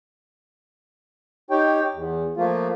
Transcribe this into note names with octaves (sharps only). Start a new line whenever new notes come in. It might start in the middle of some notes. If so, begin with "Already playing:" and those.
D#4 G4 C#5 G5
E2
F3 A3 A#3 F4